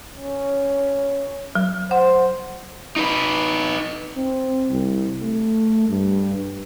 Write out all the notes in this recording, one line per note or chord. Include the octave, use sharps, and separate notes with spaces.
C#4
F#3
C5 F#5
D#4 B4
C4
C2
A3
G2